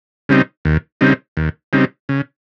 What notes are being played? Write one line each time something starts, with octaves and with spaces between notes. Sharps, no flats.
C#3 G3 C4 D#4
D#2
C#3 G3 C4 D#4
D#2
C#3 G3 C4 D#4
C#3